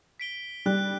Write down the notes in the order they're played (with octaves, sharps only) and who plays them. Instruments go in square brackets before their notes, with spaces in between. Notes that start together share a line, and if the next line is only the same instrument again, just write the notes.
[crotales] B6 D7 G7
[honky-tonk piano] G3 [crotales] F#6